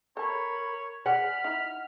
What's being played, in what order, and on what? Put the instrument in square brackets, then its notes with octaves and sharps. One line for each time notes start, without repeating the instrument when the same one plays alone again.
[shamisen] A4 A5 [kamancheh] A#4 B5 [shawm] C#5
[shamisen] G#4 D5 [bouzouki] F#5 [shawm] B5 [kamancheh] F6
[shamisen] D#4 E4